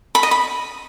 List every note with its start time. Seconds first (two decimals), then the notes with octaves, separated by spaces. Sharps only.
0.15 B5
0.23 D#5
0.31 B5